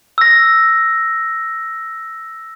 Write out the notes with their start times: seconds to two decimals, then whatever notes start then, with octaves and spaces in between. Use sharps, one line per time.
0.18 E6 A#6